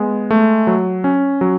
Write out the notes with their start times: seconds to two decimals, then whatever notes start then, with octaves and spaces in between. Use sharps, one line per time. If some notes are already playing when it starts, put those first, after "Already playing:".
Already playing: G#3 B3
0.31 A3
0.67 F#3
1.04 C#4
1.41 F#3